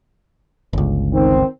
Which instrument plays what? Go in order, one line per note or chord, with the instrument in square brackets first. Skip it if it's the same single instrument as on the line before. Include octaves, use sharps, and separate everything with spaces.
[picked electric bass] G1 C#2
[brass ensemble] D#3 C4